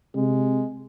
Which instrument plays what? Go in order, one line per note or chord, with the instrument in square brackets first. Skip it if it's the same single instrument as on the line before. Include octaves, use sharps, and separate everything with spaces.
[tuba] C3 [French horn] G#3